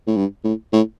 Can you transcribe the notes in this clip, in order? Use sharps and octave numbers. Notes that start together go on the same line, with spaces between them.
A2
G2
A2
A2